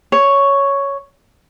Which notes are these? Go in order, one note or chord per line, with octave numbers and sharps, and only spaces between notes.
C#5